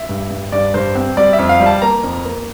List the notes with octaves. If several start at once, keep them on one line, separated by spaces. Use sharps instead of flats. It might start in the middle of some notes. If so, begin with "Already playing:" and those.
Already playing: E5
G2
G2
G2 D5
G2 C5
C4
G3 D5
E5
F2
F5
G3
A5
A#3 A#5
F2
A#3